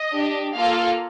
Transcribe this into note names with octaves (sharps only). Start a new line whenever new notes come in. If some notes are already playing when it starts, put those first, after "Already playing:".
Already playing: D#5
D4 G4
A#3 F4 A4 F5